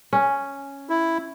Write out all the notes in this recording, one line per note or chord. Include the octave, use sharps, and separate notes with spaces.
C#4
E4